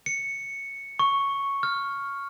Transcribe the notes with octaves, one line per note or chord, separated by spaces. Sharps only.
C#7
C#6
F6